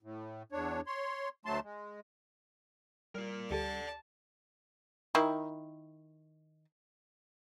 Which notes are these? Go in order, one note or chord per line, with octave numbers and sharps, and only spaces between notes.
A2
E2 D4 C#5
C#5 C6
D2 F#3 A3 A5 C6
G#3
G3 F4 A#4
D2 G4 A4 D5 F#5 A5
D#3 E4